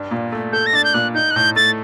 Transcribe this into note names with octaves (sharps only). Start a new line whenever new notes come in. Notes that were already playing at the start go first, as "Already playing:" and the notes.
Already playing: G2 D4
A#2
A3
A4 G6
A#6
D4 A6
G6
A#2 F#6
D#4 G6
F#6
A2 G6
A3 A6